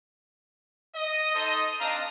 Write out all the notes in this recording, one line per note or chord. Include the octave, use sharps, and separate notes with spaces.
D#5
D#4 A4 C5 D#5
C4 D4 D#5 F5 A#5